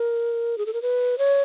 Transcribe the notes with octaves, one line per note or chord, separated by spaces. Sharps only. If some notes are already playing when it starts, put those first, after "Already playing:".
Already playing: A#4
G#4
A4
A#4
B4
C#5